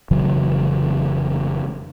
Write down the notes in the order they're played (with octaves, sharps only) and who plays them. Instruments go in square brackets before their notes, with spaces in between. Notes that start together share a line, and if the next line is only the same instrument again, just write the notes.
[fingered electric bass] F1 C#3 E3 F#3